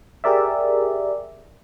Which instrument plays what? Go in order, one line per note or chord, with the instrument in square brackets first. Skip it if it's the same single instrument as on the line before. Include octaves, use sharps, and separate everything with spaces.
[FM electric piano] G4 G#4 A#4 D5 E5